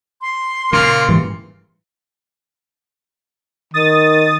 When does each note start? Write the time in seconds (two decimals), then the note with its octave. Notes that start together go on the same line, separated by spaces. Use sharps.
0.21 C6
0.73 A#2 C#3 A#3 F6
1.08 G#2 E3 G3
3.74 D#3 D#6 A6